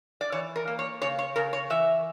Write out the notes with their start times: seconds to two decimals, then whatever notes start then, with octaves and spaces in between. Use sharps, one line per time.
0.21 D5
0.32 E3 C#5
0.56 A#4
0.68 A#3
0.79 C#5
1.02 C#3 C#5
1.19 C#5
1.36 C#3 A#4
1.53 C#5
1.70 E3 E5